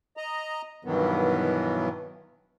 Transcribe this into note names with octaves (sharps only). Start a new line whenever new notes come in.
D#5 A#5
G2 B2 D#3 E3 F#3 B3